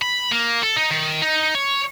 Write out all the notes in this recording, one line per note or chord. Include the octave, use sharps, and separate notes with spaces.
B5
A#3
A4
D#4
D#3
D#4
C#5